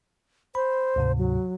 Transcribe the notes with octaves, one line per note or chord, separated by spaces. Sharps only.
C5 B5
D2 G#2 C3
F#3